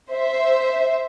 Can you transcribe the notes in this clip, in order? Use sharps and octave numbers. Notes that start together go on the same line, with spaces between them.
C5 E5